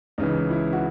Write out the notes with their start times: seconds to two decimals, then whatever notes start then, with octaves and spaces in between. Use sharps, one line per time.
0.18 C#2 C#3 E3 D#4
0.50 E4
0.73 F#4